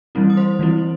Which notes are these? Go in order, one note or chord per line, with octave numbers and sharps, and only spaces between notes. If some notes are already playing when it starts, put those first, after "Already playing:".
E3 G3 C4 E4
D#6
C5 C6
E3 G3 C4 E4